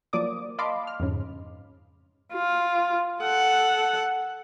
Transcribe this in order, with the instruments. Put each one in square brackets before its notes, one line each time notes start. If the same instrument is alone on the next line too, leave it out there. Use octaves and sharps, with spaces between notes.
[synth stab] F3 F#3 A#3 D5 D6 D#6
D#5 F5 A5 B5 C6 D6
F6
F2 G#2 C#3
[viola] F4
A4 F#5